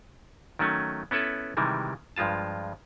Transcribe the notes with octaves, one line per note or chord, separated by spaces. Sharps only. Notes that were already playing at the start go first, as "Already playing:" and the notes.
D#3 F#3 A3 C#4
B3 C#4 E4 A4 B4
C3 D#3 E3 G3 G#3
G2 F3 G#3 F4 A5